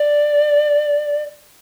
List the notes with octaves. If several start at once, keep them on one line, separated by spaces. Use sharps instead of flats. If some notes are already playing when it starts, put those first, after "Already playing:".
Already playing: D5